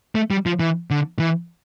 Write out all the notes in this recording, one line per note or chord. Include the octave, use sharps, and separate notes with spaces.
A3
G3
F3
E3
D3
E3